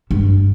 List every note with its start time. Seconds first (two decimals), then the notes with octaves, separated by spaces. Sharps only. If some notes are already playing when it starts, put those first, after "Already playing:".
0.11 G2